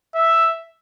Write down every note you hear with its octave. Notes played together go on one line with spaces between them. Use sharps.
E5